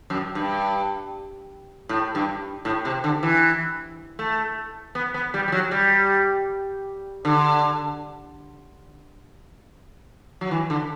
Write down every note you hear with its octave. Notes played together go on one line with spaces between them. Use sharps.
F#2
G2
A2
G2
A2
C3
D3
E3
A3
B3
B3
G3
G3
F#3
G3
D3
F#3
E3
D3